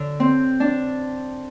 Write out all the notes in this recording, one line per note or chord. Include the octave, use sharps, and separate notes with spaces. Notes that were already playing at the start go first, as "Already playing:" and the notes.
Already playing: D3
C4
D4